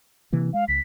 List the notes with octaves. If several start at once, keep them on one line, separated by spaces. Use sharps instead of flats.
C3 E3 A#3
G#3 F5
C#2 B6